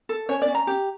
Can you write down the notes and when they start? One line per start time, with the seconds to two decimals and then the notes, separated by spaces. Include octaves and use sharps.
0.09 A4
0.29 C#4 C#5
0.42 D5
0.48 C#4
0.55 A#5
0.67 G4